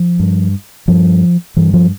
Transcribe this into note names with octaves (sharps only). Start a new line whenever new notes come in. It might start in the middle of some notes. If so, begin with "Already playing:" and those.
Already playing: F3
G2
G2 F3
G2 E3
F3